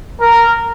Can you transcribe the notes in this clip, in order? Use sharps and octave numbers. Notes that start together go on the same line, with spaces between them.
A#4